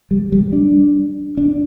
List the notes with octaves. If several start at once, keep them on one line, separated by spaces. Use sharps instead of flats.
G3
G3
D4
D4